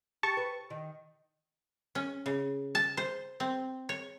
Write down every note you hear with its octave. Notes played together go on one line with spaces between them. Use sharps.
G4 A5 C#6
B4
D#3
C#4
C#3
A5
C5
C4
C#5